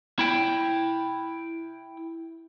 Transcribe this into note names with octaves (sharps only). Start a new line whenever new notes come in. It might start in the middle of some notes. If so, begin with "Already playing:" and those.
E4 G5